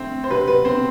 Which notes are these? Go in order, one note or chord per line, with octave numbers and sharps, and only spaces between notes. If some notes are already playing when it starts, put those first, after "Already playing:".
Already playing: D3 A3 C4 E4
C5
C3 F#3 C4 B4
B4
C4 C5